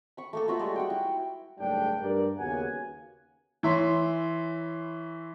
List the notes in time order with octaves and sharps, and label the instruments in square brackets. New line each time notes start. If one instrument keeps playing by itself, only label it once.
[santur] B5 C#6
A3 A#3 A4
F4 F#4 B4 E5
G3 G#3
F#4 F#5 G5
E4
[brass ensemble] F#1 G#2 G3 A3 D4 G5
G2 A#4 D5
D#2 C#3 B3 F#4 F#5 G#5
[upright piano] E3 C#5 E5 C6